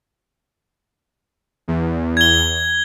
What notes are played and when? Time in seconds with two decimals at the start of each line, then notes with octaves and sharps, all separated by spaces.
1.68 E2
2.17 G#6 G7